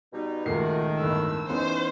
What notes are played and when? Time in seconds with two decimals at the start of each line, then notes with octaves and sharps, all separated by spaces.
0.13 B2 G3 D#4
0.46 C#2 A#2 D#3 A3 F#4 C7
0.99 G1 A2 D3 E6
1.49 E3 B3 C#4 D#4 C5 C6